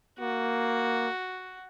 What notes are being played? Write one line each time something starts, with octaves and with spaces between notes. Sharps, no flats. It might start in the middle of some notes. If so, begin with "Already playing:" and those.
A#3 F#4